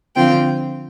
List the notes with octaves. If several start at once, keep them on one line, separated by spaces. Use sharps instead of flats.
D3 F3 C4 F4 G5